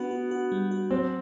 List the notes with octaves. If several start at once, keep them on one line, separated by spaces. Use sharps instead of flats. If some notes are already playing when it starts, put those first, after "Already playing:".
Already playing: B3 D4 F#4
F#4
F#4
G3
F#4
F#3 C4